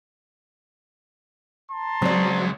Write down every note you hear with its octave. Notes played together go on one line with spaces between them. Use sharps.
A5 A#5 C6
C#2 F#3 G#3 C4 D5